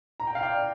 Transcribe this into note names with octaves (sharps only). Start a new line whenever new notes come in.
A#5
G5
F5
D5 G5